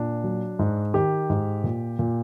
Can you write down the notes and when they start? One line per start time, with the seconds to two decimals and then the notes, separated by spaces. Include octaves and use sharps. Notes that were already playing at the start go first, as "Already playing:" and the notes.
Already playing: A#2 D4
0.24 F#3
0.59 G#2
0.94 D#3 G4
1.30 G#2
1.64 A#2
1.99 A#2